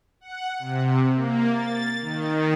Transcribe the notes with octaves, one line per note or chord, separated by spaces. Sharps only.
F#5
C3
A#3
A6
D#3